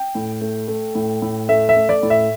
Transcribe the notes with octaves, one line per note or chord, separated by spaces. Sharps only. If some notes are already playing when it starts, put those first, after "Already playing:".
Already playing: G5
A2
A3
A3
A2
A2
A3 E5
E5
A3
D5
A2
E5